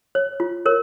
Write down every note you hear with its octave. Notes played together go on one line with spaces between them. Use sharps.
C#5
F4
A#4 C#5